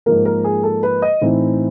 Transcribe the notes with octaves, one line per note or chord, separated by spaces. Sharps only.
G#2 F3 A#3 A#4
A#4
G#4
A4
B4
D#5
A2 E3 A3 C4 D#4